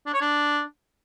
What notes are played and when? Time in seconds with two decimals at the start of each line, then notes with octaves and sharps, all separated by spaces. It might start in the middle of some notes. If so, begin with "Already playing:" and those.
0.06 D4
0.14 C#5
0.21 D4